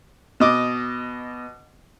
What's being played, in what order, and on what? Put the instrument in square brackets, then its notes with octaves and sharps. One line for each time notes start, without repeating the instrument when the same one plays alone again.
[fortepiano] B2 D#5 D6